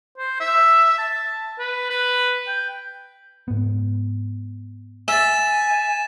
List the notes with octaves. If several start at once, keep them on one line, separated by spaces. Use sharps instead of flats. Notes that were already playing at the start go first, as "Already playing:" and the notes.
C5
E5
A5
B4
B4
G5
G#2 B3
E5 G#5 A6 B6 E7